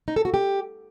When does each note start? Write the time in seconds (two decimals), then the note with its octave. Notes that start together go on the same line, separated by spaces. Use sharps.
0.08 D#4
0.16 A4
0.25 F#4
0.34 G4